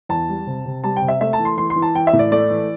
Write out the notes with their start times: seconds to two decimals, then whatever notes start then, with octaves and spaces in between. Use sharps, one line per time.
0.09 E2 A5
0.29 G3
0.47 C3
0.66 C3
0.84 G3 A5
0.96 G5
1.02 C3
1.08 E5
1.21 A3 E5
1.33 A5
1.39 E3
1.45 C6
1.57 E3 C6
1.70 C6
1.76 E3
1.82 A5
1.95 E3 G5
2.07 E5
2.13 A2
2.19 D5
2.32 A3 D5
2.50 E3